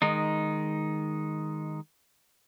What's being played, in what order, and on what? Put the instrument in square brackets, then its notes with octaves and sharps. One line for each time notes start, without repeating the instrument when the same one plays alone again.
[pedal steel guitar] D#3 G#3 D#4